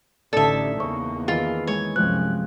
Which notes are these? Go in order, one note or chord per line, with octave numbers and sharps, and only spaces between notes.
A1 D3 D#4 A4 D5 E5 A5
E2 C#3 A#3 C#6
D#3 E3 E4 F4 G#4
G#3 C#5 G#5
C2 F#2 F3 G#3 C4 F#6